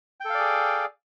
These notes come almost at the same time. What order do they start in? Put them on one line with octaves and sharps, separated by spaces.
G5 A4 F5 D5 G#4